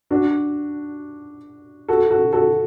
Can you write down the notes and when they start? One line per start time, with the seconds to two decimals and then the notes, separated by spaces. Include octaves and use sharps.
0.11 D4 F#4
1.88 F#4 A4
2.11 F#4 A4
2.33 F#4 A4